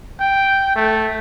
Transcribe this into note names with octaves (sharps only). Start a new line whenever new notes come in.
G5
A3